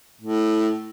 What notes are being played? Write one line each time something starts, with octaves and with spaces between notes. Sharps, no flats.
A2